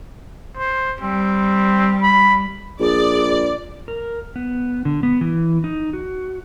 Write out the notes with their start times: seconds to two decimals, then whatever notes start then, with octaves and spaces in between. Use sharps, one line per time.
0.57 C5
1.01 G3 C4
2.02 B5
2.80 A#1 G#4 D5
3.88 A#4
4.36 B3
4.85 D3
5.03 B3
5.21 E3
5.64 D#4
5.93 F#4